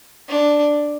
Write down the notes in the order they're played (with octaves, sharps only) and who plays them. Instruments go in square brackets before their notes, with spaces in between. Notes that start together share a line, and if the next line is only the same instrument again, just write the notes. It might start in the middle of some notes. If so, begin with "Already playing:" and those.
[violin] D4